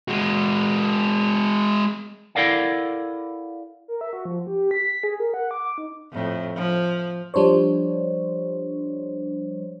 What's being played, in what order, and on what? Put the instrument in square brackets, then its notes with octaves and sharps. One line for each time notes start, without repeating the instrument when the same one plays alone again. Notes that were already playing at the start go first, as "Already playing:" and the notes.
[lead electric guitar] G#3 F#4
[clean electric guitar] E4 A4 A#4 D5 F5 F#5
[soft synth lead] A#4
E5
F#4
F3
G4
B6
G#4
A#4
F#5
D6
D#4
[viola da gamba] F2 A2
F3
[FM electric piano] F3 G3 D4 C5 C#5